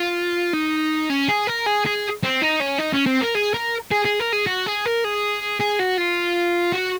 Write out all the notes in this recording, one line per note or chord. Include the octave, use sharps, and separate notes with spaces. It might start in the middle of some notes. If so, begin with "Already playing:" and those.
Already playing: F4
D#4
C#4
G#4
A#4
G#4
G#4
C4
D#4
C#4
D#4
C#4
C4
A#4
G#4
A#4
G#4
G#4
A#4
G#4
F#4
G#4
A#4
G#4
G#4
F#4
F4
F#4